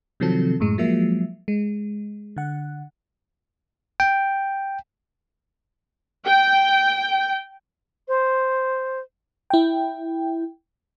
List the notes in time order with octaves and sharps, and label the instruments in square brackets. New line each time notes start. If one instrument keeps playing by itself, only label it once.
[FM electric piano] C3 D#3 F3 F#3 C4 A4
F#2 A2 G#3
F3 F#3 G#3 A#3 E5
G#3
D3 F#5
[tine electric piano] G5
[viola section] G5
[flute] C5
[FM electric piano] E4 G5